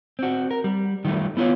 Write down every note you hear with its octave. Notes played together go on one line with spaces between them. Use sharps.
C4 F#4
A#4
G3
D#3 F#3 G3 A3
B3 E4 F4 C#5